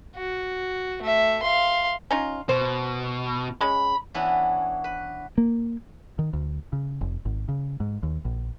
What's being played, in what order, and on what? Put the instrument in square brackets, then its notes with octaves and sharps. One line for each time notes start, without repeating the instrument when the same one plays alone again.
[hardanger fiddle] F#4
A3 E5
F5 C6
[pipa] C#4 D#4 F4
[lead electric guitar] B2 [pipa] C5
[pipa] G#3 C#4 [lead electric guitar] B5
[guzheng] E3 B3 C#4 D4 E4
B4
[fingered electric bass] A#3
D#3
D2
C#3
F1
G#1
C#3
G#2
D#2
A#1